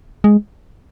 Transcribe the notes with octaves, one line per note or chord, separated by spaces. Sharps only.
G#3